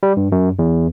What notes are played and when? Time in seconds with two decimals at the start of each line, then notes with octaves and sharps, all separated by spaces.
0.03 G3
0.17 G2
0.32 F#2
0.59 E2